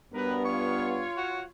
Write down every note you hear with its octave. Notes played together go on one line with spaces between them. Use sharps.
G2 F#3 G3 B3 A#4 B4
F4 C#5 C#6
F#4